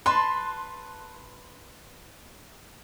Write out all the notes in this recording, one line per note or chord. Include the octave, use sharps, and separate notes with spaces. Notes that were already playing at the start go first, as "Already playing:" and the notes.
B4 A5 C6